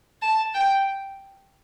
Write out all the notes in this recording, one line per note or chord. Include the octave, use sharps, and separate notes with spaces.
A5
G5